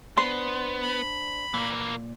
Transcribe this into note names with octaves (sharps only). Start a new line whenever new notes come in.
B3 D4 C5 C6
B5
A#2 E3 A#3